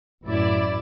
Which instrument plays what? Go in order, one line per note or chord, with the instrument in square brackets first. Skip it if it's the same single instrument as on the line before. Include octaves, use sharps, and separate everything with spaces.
[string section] A1 F#2 E4 D5